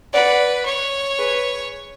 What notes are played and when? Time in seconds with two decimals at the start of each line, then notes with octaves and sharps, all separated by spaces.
0.13 B4 D5 F#5
0.65 C#5
1.18 G#4 B4